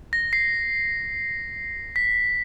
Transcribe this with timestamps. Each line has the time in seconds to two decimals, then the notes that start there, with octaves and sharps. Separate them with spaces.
0.13 A#6
0.33 C7
1.96 B6